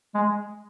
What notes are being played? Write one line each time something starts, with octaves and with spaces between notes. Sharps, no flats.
G#3